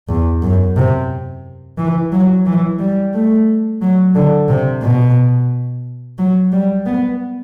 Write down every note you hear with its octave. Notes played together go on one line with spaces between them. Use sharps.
E2
F#2
C3
E3
F#3
E3
G3
A3
F#3
D3
C3
B2
F#3
G3
B3